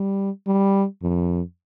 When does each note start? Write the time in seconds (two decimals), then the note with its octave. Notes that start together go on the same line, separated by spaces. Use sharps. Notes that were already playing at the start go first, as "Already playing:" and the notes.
Already playing: G3
0.47 G3
1.03 F2